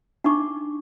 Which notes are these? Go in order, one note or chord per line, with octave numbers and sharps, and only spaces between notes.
D4 D#4 C#6 D6